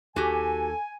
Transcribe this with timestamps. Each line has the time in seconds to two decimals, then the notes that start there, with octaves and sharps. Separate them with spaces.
0.16 D#2 F#4 G4 A4 G#5